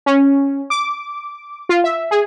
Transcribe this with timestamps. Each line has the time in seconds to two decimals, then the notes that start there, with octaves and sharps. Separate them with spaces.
0.06 C#4
0.70 D6
1.69 F4
1.84 E5
2.11 G#4